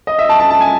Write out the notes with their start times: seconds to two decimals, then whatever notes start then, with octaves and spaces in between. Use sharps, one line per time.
0.07 D#5
0.19 E5
0.29 A5
0.40 A5
0.50 A5
0.61 G#5